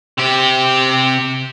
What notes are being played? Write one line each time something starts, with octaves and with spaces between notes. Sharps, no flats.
C3 G4